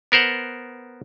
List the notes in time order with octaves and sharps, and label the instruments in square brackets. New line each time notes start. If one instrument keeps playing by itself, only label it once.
[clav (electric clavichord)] B3 A#4 C5 F#5